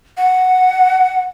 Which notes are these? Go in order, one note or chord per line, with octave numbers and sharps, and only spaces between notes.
F#5